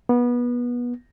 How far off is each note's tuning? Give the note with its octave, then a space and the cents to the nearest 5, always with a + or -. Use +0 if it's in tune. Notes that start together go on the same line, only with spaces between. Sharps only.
B3 -25